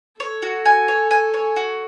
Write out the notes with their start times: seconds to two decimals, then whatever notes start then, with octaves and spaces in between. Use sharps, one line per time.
0.19 A4 C#5
0.42 F#4
0.65 G#5
0.88 C#5
1.11 G#5
1.34 C#5
1.56 F#4